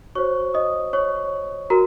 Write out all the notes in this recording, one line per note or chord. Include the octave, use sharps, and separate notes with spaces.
F#4 C5 C#5 C#6
D#5 D#6
C#5 C#6
F#4 A#4 A#5